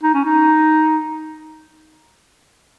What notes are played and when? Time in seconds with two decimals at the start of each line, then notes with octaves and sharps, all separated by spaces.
0.03 D#4
0.14 C#4
0.25 D#4